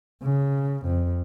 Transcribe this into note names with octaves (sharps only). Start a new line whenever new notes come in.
C#3
F2